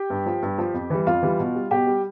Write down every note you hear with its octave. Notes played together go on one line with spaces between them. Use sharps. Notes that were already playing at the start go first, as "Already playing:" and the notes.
Already playing: G4 G5
G2
F3
G2
F3
F2
E3 G3
F2 F4 F5
E3 G3
B2
G3
B2 G4 G5
G3